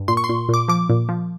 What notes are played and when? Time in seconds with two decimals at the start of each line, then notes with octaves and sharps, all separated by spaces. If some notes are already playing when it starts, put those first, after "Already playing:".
Already playing: G2
0.08 A#2 C6
0.17 C#6
0.24 C6
0.29 A#2
0.49 A#2 D6
0.68 F3 D6
0.90 A#2
1.09 F3